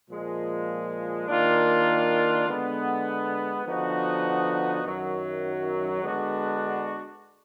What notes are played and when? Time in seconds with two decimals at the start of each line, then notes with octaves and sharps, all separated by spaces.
0.09 A#2 F3 G#3
1.28 D#3 A#3 D4 F4
2.46 D3 G#3 B3
3.65 D3 F3 B3 D#4 F#4
4.84 F#2 D#3 F#3
6.03 D3 G#3 B3 D4 F#4